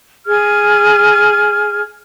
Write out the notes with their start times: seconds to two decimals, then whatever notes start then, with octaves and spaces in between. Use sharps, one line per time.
0.26 G#4 F6 G#6